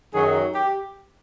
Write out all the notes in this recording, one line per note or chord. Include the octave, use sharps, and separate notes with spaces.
F#2 D#3 F#3 G#4
G4